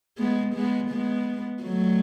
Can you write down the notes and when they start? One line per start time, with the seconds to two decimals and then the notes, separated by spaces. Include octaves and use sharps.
0.18 G#3 B3
0.55 G#3 B3
0.90 G#3 B3
1.63 F#3 A3